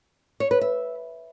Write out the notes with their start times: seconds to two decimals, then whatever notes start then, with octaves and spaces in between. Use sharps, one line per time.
0.40 C#5
0.51 B4
0.61 E5